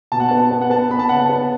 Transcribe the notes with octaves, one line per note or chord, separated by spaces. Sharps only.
B2 A5
F#5
B3 A5
B3
F#5
B3 A5
B3 B5
A5
C#3 F#5
A5
B3